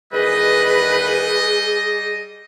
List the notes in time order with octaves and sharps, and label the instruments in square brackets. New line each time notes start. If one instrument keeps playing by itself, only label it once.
[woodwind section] E2 D#3 B4 [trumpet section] G3 D#5 [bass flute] G#4